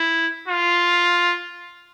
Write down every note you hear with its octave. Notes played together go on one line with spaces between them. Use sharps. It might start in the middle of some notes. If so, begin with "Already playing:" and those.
Already playing: E4
F4